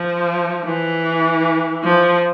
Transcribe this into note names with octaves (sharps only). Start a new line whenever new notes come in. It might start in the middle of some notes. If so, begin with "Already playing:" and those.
Already playing: F3
E3
F3